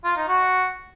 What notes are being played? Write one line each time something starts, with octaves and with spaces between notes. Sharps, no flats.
F4
D#4
F#4